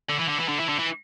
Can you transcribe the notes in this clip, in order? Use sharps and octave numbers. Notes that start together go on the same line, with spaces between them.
D3
E3
D3
E3
D3
E3
D3
E3